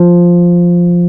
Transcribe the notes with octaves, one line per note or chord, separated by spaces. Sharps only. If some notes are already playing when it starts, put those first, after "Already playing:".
Already playing: F3